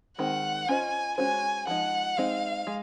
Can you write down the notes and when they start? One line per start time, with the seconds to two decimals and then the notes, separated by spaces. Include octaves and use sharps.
0.18 D#3 G#3 C4 F#5
0.68 C#4 F4 C5 D#5 G#5
1.18 G#3 C#4 F#4 C5 G#5
1.67 F3 G#3 D#4 F#5
2.17 G#3 C4 D#4 F5
2.67 G#3